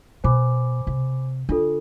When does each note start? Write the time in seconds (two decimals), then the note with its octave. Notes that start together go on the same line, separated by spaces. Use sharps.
0.24 B2 C5 G#5 B5 D6
0.87 C3
1.49 D3 D4 F4 A4